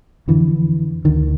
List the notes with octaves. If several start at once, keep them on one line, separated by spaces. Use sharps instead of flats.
F2 D3 E3
D2 D3 D#3